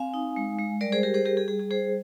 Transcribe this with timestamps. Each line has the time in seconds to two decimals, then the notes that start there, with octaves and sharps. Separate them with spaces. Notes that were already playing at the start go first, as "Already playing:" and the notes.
Already playing: C4 F5 G#5
0.14 D#4
0.36 G#3
0.58 G#3
0.81 G3 A#4 D5
0.92 G#4 C5
1.03 G3 G4 A#4
1.14 G#4 C5
1.25 G3 G4 A#4
1.37 G#4
1.48 G3 G#4
1.60 G#4
1.70 G3 G#4 C5